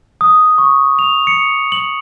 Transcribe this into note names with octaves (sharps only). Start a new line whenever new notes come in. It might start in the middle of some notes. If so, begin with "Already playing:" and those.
D#6
C#6
F7
C#7
F#7